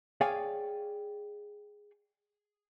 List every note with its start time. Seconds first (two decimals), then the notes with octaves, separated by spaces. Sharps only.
0.21 G#4 C#5 D5 F5 G5 G#5